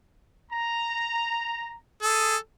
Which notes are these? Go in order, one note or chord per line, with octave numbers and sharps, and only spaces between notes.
A#5
G#4 A4 D#6